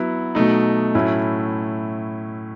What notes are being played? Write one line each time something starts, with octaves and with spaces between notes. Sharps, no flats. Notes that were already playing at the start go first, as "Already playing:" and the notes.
Already playing: F#3 B3 E4
B2 F#3 A3 D#4
A2 F#3 A3 C#4 E4